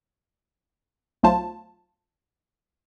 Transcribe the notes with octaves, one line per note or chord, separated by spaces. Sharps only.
B1 F#3 A3 F4 C5 A5